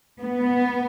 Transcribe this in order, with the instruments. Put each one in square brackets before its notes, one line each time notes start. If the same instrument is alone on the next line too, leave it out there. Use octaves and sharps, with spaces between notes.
[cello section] B3